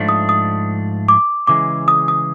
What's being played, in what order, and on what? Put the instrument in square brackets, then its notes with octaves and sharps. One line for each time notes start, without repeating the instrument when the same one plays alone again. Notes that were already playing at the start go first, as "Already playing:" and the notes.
Already playing: [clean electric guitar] G#2 F3 A3 D4
[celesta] D#6
D#6
D6
[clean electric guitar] C#3 E3 G#3 [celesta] D6
[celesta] D#6
D#6